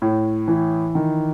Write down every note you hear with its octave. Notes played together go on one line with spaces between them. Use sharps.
A2
E3
D#3